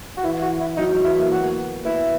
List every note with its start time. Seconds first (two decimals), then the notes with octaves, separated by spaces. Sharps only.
0.17 F#4
0.23 E3 E4
0.42 F#4
0.60 E4
0.77 F#3 D#4
0.91 F#3
1.04 E3 E4
1.17 A#3
1.30 B3 F#4
1.40 A#3
1.85 B3 E4